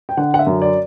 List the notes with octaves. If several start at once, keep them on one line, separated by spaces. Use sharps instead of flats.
G5
D3 F#5
F#5
E5
F#2
D5